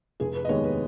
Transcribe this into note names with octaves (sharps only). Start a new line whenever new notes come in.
F1 G#4
B4
D#5
D#2 D#3 G#3 B3 C#5
B4